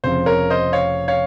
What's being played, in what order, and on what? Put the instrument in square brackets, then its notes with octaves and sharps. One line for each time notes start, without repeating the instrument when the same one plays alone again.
[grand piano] F1 F2 C#3 F3 C5
A#4 C#5
C5 D#5
C#5 F5
C#5 F5